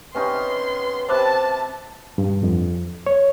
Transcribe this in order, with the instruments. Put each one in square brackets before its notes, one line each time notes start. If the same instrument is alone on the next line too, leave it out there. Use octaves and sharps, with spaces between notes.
[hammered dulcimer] C3 C#4 D#4 [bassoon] B3 [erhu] C6
[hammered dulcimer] C3 B4 E5 [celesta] C5 D6 F#6 [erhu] A5
[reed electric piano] G2
F2
C#5